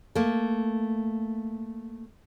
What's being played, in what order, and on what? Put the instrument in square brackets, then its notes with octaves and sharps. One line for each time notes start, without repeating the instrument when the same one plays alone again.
[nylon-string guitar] A3 A#3